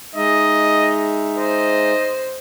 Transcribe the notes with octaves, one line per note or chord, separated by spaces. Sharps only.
G#3 D#4 D#5 E5
C5 D#5